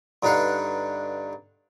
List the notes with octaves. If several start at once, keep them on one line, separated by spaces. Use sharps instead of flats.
G2 D3 D#4 B4 F5 F#5